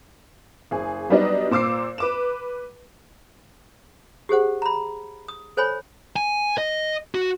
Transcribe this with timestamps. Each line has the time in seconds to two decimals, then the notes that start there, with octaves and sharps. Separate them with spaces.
0.71 F#1 G#4
1.10 F#3 G3 B3 D4 D#4 D#5
1.51 A#2 C5 D6 E6 C7
1.98 B4 D6 E7
4.29 G4 G#4 C5 F#5
4.62 A#5 B5
5.28 D#6
5.57 A4 C5 C#5 G#5 B5
6.16 G#5
6.58 D#5
7.15 F#4